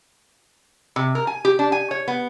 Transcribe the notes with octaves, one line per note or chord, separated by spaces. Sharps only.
C3
A#4
G#5
G4
D4
G#5
C#5
B3